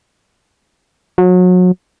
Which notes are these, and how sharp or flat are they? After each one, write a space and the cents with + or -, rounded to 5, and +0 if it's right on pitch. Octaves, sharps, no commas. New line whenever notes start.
F#3 -30